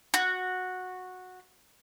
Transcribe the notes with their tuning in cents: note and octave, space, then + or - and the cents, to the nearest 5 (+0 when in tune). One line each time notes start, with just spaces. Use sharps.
F#4 -10